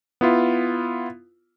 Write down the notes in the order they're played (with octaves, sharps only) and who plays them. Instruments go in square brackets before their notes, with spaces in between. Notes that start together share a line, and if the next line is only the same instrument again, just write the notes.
[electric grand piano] B3 E4 F4